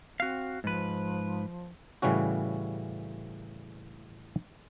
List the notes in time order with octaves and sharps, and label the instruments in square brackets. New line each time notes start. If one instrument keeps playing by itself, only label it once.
[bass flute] C4 [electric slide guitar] F#4 F5
[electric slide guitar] G#2 B4 [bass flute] F3
[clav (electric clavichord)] A2 C#3 E3 G3 C#4 F#4